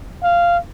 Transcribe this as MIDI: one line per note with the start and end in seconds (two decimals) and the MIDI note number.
0.23 0.58 77